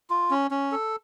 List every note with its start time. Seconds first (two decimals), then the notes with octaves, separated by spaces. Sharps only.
0.10 F4
0.31 C#4
0.51 C#4
0.72 A4